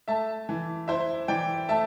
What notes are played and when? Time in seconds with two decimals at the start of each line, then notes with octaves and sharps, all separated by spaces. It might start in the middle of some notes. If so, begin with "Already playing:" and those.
0.08 A3 E5 A5
0.49 E3
0.88 E4 C5 E5
1.28 E3 D5 G5
1.69 A3 E5 A5